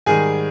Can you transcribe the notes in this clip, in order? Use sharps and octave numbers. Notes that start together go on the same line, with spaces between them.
G#2 D#3 G3 G#4 G#5